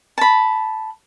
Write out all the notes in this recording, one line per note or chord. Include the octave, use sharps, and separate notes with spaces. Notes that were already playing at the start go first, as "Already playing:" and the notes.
A5 B5